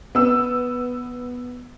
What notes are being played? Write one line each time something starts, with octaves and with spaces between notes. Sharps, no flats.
B3 E6